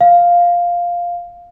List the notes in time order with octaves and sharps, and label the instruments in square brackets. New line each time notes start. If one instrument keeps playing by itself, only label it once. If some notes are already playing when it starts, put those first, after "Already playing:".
[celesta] F5